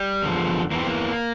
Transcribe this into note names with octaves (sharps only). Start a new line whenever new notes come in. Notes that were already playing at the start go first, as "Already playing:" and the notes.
Already playing: G3
E2 D3 F3
E2 E3 A#3
C4
A#3